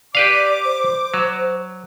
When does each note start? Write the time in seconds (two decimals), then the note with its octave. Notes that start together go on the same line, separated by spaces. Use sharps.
0.15 G4 B4 D5 F5 D6
0.65 C5
1.14 F#3